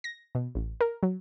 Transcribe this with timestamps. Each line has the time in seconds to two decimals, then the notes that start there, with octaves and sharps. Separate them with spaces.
0.04 A#6
0.35 B2
0.55 A1
0.81 A#4
1.03 F#3